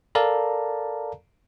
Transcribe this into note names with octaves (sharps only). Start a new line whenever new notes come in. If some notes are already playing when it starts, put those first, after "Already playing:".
A4 A#4 D5 F5 A5 A#5